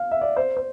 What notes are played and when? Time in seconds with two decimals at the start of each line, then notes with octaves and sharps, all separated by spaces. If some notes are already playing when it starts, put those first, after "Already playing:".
Already playing: F5
0.11 E5
0.21 D5
0.36 C5
0.57 C5